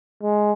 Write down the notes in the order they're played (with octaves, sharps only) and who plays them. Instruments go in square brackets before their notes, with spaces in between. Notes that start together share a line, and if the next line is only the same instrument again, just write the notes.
[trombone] G#3